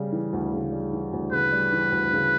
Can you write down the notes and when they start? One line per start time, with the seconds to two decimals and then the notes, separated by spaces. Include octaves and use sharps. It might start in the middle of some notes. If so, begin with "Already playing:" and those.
Already playing: C#3 G3
0.13 E3
0.33 D2
0.53 C#3
0.72 G3
0.93 E3
1.13 D2
1.32 C#3 B4
1.52 G3
1.72 E3
1.92 D2
2.13 C#3